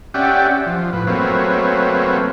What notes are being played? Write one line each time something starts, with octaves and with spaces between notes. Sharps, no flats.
C#4 G4 D5 E5 F#5 G5
F3
A2 B4
F#3 A3 A#3 C4 B4 C#5